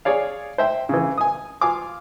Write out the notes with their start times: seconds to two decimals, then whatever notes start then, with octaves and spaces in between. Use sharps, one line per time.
0.05 G#4 C#5 D5 F5
0.58 C5 E5 G5
0.89 C#3 E3
1.18 G#5 D#6
1.61 F4 F5 G#5 D6